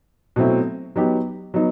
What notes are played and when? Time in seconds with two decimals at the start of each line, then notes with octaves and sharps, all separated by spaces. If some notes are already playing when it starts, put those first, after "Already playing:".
0.36 B2 F#3 A3 C4 E4
0.96 F#3 B3 D#4 G4
1.54 F#3 B3 D#4